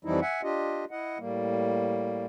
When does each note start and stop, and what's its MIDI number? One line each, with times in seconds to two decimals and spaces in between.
0.05 0.20 41
0.05 0.20 52
0.05 0.20 53
0.05 0.20 55
0.05 0.20 63
0.05 0.20 64
0.22 0.41 76
0.22 0.41 78
0.22 0.41 80
0.43 0.85 62
0.43 0.85 65
0.43 0.85 67
0.43 0.85 75
0.91 1.18 64
0.91 1.18 75
0.91 1.18 78
1.19 2.26 45
1.19 2.26 55
1.19 2.26 58